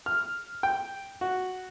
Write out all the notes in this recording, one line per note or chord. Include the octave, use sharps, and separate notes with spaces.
F6
G5
F#4